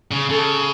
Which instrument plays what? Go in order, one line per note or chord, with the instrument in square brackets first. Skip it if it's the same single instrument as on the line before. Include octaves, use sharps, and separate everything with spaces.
[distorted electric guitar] C#3
[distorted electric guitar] C#3 [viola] A4